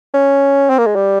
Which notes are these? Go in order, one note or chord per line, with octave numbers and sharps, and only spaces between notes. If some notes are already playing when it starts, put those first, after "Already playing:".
C#4
C4
A#3
G#3
G3